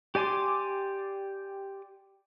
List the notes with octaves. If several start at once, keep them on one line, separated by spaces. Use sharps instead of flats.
G4 D5 G#5 C6 D6